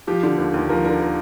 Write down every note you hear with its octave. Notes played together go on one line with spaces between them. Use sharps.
F3 G4
D3
D#2
D#2
F3 A#4
D3 A#4
A#4